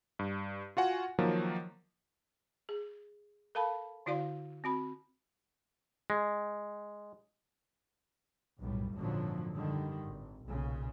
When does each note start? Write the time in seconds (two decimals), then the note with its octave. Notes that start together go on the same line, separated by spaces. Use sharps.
0.19 G2
0.77 F4 F#4 F#5 G#5
1.19 D#3 F3 F#3 A#3
2.69 G#4
3.55 A4 A#4 F5 A5 B5
4.06 D3 E4 F#4 D5 F5 C6
4.64 C4 F#4 B5
6.10 G#3
8.59 B1 F#2 A2 G3
8.94 G#1 F#2 A#2 D3 F3 F#3
9.53 D3 D#3 G3
10.05 G#1
10.44 B1 A#2 C#3